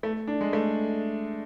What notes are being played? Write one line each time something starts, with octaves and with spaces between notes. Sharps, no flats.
A3
D4
G#3
A3